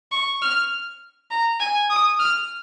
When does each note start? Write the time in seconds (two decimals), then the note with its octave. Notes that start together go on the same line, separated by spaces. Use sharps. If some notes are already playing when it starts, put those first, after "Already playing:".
0.12 C#6
0.42 F6
1.30 A#5
1.60 G#5
1.90 D#6
2.19 F6